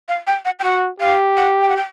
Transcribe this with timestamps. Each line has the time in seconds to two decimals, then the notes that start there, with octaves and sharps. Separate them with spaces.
0.08 F5
0.27 G5
0.45 F#5
0.59 G5
0.64 F#4 F#5
1.00 G4 F5
1.37 F#5
1.62 G5
1.69 F#5
1.76 G5